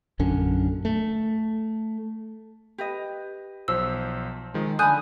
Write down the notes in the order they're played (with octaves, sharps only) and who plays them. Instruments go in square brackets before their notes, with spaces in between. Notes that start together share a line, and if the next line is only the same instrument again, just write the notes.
[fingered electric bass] A#1 F#2 D3 C#4
A3
[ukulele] G4 B4 D#5
[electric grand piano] B1 F3 C5 [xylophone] E6
[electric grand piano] D#3 F3 G#3
[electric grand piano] D3 [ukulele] G#5 B5 [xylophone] D#6 F#6 G6